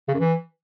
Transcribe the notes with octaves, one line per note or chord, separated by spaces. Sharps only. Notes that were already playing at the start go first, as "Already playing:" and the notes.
C#3
F#2
E3